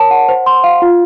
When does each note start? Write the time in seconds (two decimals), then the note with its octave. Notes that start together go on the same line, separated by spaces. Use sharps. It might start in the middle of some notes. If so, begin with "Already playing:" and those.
Already playing: A#4 C#5 A5
0.11 F#5
0.29 C5
0.46 C6
0.64 F5
0.82 F4